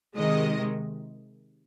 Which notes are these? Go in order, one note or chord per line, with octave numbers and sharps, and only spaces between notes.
C3 D#3 G#3 D#5